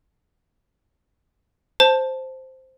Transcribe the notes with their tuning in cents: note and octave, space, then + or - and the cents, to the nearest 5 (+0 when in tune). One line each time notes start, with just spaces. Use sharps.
C5 +0 A5 +0